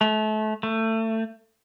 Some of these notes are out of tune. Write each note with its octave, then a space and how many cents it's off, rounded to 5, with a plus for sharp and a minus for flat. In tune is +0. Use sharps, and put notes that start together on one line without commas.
A3 -30
A3 +25